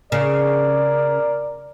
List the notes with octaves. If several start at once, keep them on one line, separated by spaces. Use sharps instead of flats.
C#3 A#4 D5